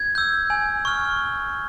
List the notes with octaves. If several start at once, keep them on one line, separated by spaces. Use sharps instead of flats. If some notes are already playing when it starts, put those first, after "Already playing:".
Already playing: G#6
E6 G6
G#5
C#6 F6